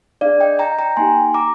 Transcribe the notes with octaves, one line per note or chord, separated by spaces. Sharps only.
D4 G#4 D5 F5
D#5 G5
G5 A#5
G5 A#5
A#3 D#4 G4 G#5 C6
A#5 D6